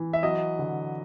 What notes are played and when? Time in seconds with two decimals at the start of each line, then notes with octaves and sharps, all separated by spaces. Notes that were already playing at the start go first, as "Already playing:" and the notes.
Already playing: E3
0.13 E5
0.23 F#3 D#5
0.59 D3